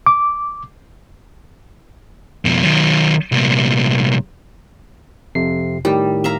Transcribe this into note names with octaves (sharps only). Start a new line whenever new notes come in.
D6
F2 B2
D#3 F#3
C2 A#2
F2 C3 C7
A2 D#3 G3
E5 F5 A#5